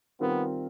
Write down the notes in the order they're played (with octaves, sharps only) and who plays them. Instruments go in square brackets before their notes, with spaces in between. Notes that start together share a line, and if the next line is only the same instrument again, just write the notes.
[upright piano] D#3 G3 C4 F4 A#4 [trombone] B3